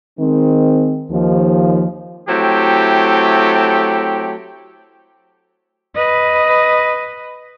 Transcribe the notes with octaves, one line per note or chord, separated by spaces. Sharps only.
D#3 G#3 C4
D#2 F3
F#3 A3 C4 E4 G4
B4 D#5